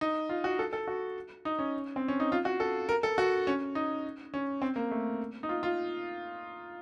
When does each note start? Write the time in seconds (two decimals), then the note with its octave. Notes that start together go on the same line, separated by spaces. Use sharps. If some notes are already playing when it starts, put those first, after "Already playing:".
0.01 D#4
0.29 F4
0.44 F#4
0.59 A4
0.73 A4
0.87 F#4
1.45 D#4
1.59 C#4
1.96 C4
2.08 C#4
2.20 D#4
2.32 F4
2.45 F#4
2.60 A4
2.89 A#4
3.03 A4
3.18 F#4
3.47 C#4
3.75 D#4
4.34 C#4
4.62 C4
4.76 A#3
4.91 A3
5.43 D#4
5.49 F4
5.63 F4